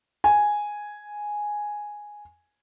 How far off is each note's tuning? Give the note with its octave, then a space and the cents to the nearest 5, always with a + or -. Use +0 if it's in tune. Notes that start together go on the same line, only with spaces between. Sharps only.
G#5 +0